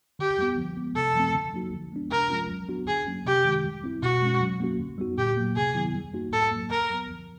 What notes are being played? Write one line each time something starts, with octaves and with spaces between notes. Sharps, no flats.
D3 G4
G3 B3
F3
G#3 B3
C3 A4
F3 A3 C4
D3
F#3 A#3 D#4 F#4
F3
G#3 B3 D4
C3 A#4
F3 G#3 C#4 F4
F#3
B3 D4 F#4
D3 G#4
F#3 A#3 C#4
C3 G4
D#3 G#3
G3
C4 E4
B2 F#4
G#3 C#4
F#3
A#3 C#4 F#4
D3
G3 B3 D#4 F#4
A#2 G4
F#3 A#3
C3 G#4
D#3 F#3 B3 E4
G3
A#3 D#4 F#4
A2 A4
F#3 A#3
D3 A#4
F#3 B3
F3